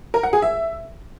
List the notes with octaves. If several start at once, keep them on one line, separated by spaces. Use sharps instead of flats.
A#4
F#5
G#4
E5